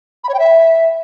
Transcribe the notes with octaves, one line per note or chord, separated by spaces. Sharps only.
B5
C#5
G5
E5